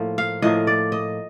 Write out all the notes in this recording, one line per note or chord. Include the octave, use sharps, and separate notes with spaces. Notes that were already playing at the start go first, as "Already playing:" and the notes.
Already playing: A2 F3 A#3
F5
A2 F3 A#3 D#5
D5
D#5